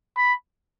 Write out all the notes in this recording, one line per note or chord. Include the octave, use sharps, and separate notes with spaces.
B5